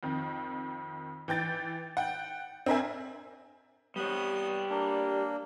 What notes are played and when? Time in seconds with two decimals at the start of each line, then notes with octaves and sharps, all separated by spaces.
0.03 F2 D#3
1.28 E3 G5 G6 A6
1.97 F#5 G5
2.66 C4 D4 A#4 E5 G#5
3.96 G3 B3 C#5 D#6
4.70 A#3 D4